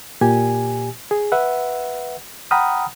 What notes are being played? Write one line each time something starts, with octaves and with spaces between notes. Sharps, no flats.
A#2 G4 G#5
G#4
B4 E5 F#5
F#5 G5 A#5 B5 D#6 F6